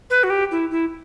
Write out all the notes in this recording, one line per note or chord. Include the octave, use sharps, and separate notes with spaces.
B4
F#4
G4
E4
E4